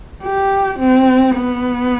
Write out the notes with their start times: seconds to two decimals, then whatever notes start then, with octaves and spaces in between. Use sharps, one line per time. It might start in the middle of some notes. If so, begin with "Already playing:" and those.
0.23 G4
0.79 C4
1.36 B3